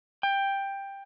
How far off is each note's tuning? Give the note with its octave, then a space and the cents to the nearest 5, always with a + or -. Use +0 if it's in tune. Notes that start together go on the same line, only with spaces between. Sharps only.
G5 +10